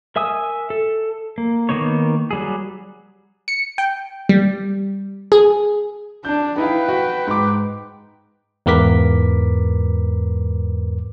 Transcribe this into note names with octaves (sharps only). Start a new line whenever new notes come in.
A#4 E5 G#5 D#6 E6
A4
A#3
D#3 A#3 B3 D#4 C#5
F#3 G3 G#4
C#7
G5
G3
G#4
D4 G6
D#4 E4 B4 F5 G5
F#4
G#2 D6
E2 G#2 A#4 B4 D6 B6